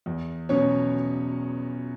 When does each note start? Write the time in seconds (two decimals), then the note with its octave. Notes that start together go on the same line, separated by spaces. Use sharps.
0.06 E2
0.49 B2 F#3 C#4 C#5